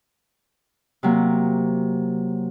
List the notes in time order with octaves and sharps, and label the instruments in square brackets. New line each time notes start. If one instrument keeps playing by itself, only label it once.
[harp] C3 F#3 A#3